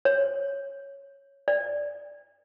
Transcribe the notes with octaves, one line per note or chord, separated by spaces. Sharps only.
C#5
D5